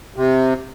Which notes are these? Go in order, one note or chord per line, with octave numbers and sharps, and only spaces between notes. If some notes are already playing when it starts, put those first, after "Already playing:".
C3